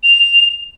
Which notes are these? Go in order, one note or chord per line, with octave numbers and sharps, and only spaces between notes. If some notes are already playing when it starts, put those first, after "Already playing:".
F7